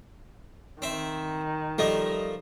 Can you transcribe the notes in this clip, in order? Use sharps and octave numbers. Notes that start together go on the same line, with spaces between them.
D#3 C4 E5
F3 G3 A3 A#3 D#5